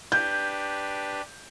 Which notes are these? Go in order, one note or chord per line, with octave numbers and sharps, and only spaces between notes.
D4 G4 B4 G6